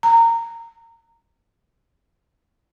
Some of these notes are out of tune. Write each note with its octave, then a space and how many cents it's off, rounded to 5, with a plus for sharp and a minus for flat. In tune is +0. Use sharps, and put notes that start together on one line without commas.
A#5 -20